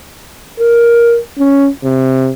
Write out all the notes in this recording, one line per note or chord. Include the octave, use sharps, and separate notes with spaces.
A#4
C#4
C3